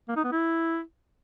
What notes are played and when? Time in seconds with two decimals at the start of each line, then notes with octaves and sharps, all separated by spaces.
0.08 A#3
0.16 D#4
0.24 B3
0.32 E4